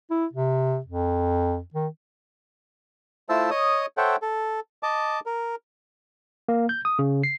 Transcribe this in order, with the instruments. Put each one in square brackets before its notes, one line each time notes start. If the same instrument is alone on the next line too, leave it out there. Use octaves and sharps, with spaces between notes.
[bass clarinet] E4
C3
F2
D#3
[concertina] A3 E4 F4 C5 A5 E6
C#5 D#5 D#6
A4 C5 C#5 E5 F#5 G5
A4
D#5 A5 D6
A#4
[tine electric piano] A#3
G6
D#6
C#3
C7